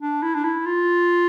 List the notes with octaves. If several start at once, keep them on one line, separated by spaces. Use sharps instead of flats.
D4
E4
D4
E4
F4